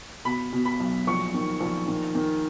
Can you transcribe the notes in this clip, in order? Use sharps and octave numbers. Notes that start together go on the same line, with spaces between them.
B2 B5
B2
B5
B1
A#1 C#6
D#3
A#1
D#3
D#3